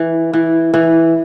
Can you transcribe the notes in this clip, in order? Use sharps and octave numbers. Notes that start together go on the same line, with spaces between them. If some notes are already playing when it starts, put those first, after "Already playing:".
Already playing: E3
E3
E3